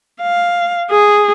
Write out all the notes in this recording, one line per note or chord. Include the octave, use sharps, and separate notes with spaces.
F5
G#4